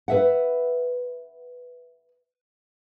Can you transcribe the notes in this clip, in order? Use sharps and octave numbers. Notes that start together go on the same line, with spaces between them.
B4 E5 F#5